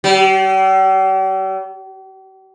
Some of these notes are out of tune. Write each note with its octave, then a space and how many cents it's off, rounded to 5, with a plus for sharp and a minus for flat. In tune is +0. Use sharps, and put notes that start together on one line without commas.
G3 -45